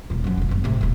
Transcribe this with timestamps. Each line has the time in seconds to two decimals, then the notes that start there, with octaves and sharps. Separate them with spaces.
0.10 D#1 D2
0.24 F#2 F3
0.37 E1 A2
0.49 F#1 C2
0.64 A2 C3
0.81 D#1 D2